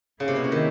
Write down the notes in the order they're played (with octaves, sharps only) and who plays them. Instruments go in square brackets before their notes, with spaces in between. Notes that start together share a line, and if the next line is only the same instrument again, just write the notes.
[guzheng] C#3 [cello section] A#3 C#4 E4
[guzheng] C3
B2
C3
D#3